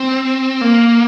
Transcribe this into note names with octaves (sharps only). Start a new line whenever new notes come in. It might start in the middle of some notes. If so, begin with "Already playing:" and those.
Already playing: C4
A#3